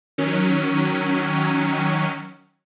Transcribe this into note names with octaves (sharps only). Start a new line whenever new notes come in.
D#3 F#3 C#4